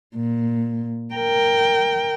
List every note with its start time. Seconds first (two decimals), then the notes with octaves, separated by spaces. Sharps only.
0.15 A#2
1.15 A#4 G5